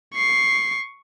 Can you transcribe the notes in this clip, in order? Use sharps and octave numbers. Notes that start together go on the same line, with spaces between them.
C#6 C7